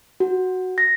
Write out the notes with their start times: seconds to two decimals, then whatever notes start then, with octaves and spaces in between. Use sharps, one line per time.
0.20 F#4
0.78 A#6